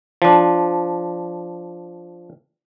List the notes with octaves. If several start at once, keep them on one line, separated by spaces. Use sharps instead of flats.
F3 D4